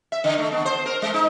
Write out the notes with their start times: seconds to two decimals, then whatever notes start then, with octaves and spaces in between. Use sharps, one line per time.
0.12 E5
0.24 D3
0.38 A3
0.52 B3
0.65 C5
0.86 A#4
1.02 G#3
1.14 D#4